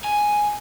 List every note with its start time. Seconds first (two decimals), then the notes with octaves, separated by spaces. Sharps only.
0.04 G#5